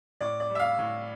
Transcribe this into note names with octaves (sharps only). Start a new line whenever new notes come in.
A2 D5
D5
G3
E5
F5
A2